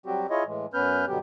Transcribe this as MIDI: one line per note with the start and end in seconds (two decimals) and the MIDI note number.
0.06 0.27 54
0.06 0.27 55
0.06 0.27 60
0.06 0.27 66
0.06 0.27 67
0.30 0.44 64
0.30 0.44 65
0.30 0.44 68
0.30 0.44 73
0.30 0.44 75
0.46 0.66 45
0.46 0.66 52
0.46 0.66 56
0.74 1.05 42
0.74 1.05 59
0.74 1.05 61
0.74 1.05 71
0.74 1.05 89
0.74 1.05 91
1.08 1.19 43
1.08 1.19 47
1.08 1.19 50
1.08 1.19 54
1.08 1.19 59
1.08 1.19 67